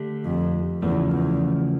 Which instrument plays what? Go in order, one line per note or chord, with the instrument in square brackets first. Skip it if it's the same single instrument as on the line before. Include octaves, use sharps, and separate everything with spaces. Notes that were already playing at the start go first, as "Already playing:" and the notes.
Already playing: [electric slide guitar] D3 A3 D4 G4
[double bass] F2
[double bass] E2 [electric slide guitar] C#3 F3 A3
[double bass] E2